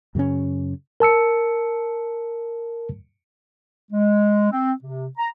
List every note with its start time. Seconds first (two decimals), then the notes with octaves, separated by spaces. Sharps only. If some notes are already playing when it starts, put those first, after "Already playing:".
0.15 F#2 C#3 C4 C#4
1.00 A#4 A5 E6 C#7
3.91 G#3
4.51 C4
4.82 C3
5.18 A#5